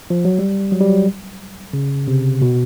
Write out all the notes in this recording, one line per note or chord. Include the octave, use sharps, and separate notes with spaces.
F3
F#3
G3
F#3
G3
F#3
C#3
C3
B2